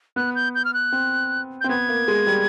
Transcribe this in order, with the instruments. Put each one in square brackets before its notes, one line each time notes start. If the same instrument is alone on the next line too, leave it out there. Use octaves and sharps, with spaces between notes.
[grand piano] B3 [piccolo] F#6
[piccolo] G6
G6
F6
F#6
[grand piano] C4
[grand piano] C4 [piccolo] G6
[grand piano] B3 [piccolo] G#6
[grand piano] A#3
G#3
G3